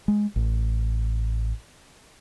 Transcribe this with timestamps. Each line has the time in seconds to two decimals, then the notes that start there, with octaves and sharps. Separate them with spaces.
0.08 G#3
0.36 A1